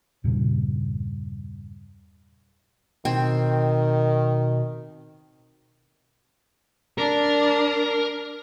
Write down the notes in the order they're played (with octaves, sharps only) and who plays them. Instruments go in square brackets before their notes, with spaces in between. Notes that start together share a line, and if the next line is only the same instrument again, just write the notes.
[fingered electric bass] E2 G2 A#2 C#3
[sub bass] B2 [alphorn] D#3 [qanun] C4
[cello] D4 [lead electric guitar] A#4